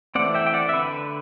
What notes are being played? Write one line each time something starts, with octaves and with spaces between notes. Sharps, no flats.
E3 A3 C4 D5 F#5
E5 G5
G5
D5 F#5
E5
D3 B4